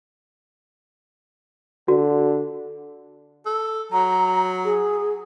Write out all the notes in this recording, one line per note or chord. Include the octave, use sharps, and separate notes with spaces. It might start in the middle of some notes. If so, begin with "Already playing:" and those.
D3 F#4
A4
F#3 A#5
G#4